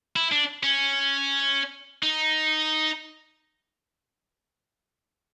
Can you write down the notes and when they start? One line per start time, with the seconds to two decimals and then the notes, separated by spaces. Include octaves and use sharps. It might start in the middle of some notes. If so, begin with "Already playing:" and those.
0.16 E4
0.32 D4
0.63 C#4
2.03 D#4